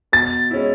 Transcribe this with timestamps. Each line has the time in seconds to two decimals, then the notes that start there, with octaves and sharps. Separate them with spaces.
0.12 B2 A6
0.51 G#3 C#4 E4